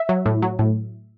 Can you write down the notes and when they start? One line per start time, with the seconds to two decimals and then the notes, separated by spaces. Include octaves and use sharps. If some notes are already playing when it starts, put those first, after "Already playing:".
Already playing: E5
0.09 F#3
0.26 A2
0.42 F#3
0.59 A2